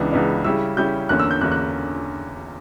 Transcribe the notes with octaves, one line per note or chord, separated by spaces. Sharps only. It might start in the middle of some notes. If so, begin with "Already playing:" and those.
Already playing: C#2 C#3 E3 B3 D4
C#2 C#3 E3 B3 D4
C#3 G3 C#4 E4 E6
C#3 G3 C#4 E4 G6
E2 D3 A#3 C#4 F#6
E6
G6
E2 D3 A#3 C#4 F#6
F#6